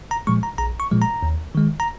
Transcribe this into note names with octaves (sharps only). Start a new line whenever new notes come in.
A#5
A#2 F3 G#3 C#6
A#5
A#1 A#5
C#6
A#2 F3 G#3
A#5
D#2
D#3 G#3
A#5